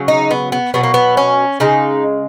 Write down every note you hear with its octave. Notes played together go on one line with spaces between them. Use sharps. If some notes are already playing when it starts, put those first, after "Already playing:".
Already playing: C#3 F#3
D#4
B3
B3
B2 F#3 B3
A#3
B3
C#4
C#3 G#3 D#4